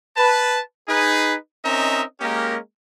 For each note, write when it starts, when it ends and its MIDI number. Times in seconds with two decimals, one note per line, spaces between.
0.17 0.60 71
0.17 0.60 81
0.89 1.34 63
0.89 1.34 68
0.89 1.34 71
1.64 2.02 60
1.64 2.02 61
1.64 2.02 63
1.64 2.02 70
1.64 2.02 75
1.64 2.02 76
2.20 2.57 56
2.20 2.57 58
2.20 2.57 61
2.20 2.57 67
2.20 2.57 70
2.20 2.57 75